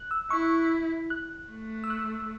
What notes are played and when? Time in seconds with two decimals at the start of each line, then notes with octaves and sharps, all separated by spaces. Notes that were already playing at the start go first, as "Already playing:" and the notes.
Already playing: F#6
0.11 E6
0.30 E4 C#6
1.10 F#6
1.51 A3
1.84 E6
1.90 F#6